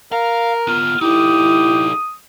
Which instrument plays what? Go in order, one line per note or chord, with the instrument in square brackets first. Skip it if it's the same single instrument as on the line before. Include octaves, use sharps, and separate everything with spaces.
[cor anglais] A#4 [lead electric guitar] F5
[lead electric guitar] B3 F4 [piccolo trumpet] F6
[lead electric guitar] D#4 A4 [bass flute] E4 [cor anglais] G4 [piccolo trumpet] D#6